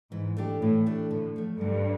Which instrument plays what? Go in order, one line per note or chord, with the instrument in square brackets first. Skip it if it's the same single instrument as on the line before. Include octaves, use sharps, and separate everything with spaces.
[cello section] G#2 [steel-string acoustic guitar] E3
[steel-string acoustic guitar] A3 D4 G4
[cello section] A2 [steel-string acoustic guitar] E3
[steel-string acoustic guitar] A3 D4 G4
[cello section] A2 [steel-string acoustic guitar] D3
[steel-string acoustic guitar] F3 A3
[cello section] G2 [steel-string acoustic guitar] D3